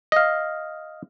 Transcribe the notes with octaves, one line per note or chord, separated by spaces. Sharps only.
D#5 F5